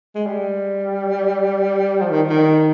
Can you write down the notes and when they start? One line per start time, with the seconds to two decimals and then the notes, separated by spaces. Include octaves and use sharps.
0.15 G#3
0.27 G3
2.00 F3
2.10 D#3
2.30 D#3